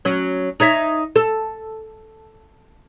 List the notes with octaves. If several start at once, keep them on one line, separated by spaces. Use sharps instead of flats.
F#3 C#4
D#4 C#5 E5
A4